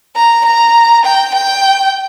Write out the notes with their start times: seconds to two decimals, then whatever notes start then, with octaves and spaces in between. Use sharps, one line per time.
0.16 A#5
0.45 A#5
1.05 G5
1.34 G5